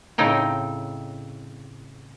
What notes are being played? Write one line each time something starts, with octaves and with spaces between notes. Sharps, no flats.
A2 C#3 C4 D#4 G5